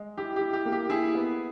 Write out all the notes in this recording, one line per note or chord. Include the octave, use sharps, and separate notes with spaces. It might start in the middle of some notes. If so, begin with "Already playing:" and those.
Already playing: G#3
E4 G4
E4 G4
G4
A#3
G4
E4 G#4
B3